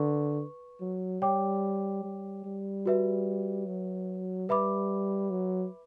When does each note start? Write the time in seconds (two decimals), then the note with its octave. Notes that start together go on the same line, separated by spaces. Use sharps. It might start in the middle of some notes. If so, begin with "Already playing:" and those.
Already playing: D3 B4 C#6
0.81 F#3
1.22 G3 C#5 G5 D6
2.04 G3
2.45 G3
2.86 F#4 B4 E5
3.66 F#3
4.48 G3 B4 E5 B5 D6
5.31 F#3